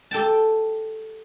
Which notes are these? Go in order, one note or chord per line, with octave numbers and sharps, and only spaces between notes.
G4 A4 G5 A5